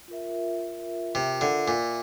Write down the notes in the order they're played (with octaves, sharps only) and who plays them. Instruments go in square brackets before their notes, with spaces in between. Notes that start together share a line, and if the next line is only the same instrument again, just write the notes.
[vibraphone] F4 A#4 E5
[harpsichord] C3
D3
A#2